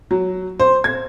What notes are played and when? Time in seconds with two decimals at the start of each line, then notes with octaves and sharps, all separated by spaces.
0.11 F#3
0.60 C5
0.84 G#6